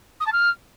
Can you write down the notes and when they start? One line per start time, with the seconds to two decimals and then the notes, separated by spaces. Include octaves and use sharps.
0.20 D#6
0.26 A5
0.32 F6